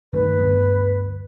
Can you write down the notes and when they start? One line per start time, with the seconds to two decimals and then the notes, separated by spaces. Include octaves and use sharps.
0.13 G2 D#3 A3 B4
0.39 D2 G2 B3